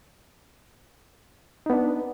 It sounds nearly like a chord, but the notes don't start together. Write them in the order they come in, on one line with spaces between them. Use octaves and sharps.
D#4 B3 D4